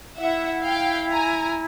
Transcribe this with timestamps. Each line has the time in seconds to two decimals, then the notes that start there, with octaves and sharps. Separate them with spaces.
0.18 E4 E5 F#5
0.64 F5 G5
1.12 G#5 A#5